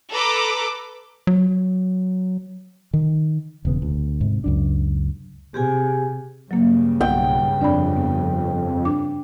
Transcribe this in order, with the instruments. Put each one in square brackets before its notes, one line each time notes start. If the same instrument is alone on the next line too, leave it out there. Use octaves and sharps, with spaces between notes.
[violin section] A4 B4 A#5 D6
[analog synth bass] F#3
[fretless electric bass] D#3
E1 C#3 B3
D2
G#2 C3
C#2 F#2 D4
[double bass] C3 [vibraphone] G4 G#4 G#5
[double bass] G2 C#3 [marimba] F#3 A#3
[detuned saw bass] B1 [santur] G5
[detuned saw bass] F2 [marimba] D4 D5 B5
[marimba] B3
D4 D6